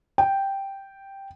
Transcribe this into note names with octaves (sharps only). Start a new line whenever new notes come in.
G5